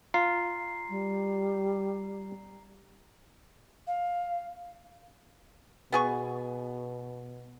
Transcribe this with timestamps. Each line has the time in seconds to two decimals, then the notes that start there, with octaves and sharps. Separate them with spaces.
0.14 F4 A#5 C7
0.89 G3
3.87 F5
5.92 B2 B3 G#4 C#6